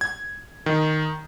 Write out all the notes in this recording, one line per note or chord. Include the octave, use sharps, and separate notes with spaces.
G#6
D#3